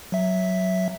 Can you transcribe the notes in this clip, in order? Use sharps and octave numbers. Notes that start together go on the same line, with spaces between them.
F#3 E5